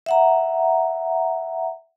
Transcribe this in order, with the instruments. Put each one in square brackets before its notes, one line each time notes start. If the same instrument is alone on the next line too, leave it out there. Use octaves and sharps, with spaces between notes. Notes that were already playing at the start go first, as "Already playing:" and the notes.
[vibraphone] E5 F#5 A#5